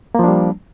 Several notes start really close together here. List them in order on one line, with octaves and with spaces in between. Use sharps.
A#3 F3 D4 G3